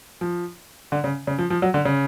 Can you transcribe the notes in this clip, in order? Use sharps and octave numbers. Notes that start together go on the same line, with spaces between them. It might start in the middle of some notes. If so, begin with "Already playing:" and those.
F3
D3
C#3
C#3
F3
F3
F#3
D3
C#3